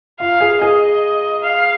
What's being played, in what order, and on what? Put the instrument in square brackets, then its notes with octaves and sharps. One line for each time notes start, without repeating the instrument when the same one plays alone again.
[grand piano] F4 [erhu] F5
[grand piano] G#4
[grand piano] G#4 [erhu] D#5
[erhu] F5